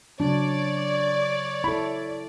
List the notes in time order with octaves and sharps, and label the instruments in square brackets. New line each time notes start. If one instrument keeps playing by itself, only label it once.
[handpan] C#3 F#3 [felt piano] D4 [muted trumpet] C#5 [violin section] D5
[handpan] E4 A4 [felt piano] B5